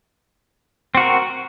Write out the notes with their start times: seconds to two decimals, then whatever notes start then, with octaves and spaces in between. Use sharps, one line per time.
0.95 C4
0.97 F#4
1.00 A#4